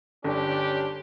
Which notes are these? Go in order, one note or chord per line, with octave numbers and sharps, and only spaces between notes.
G1 C#4 D4 G4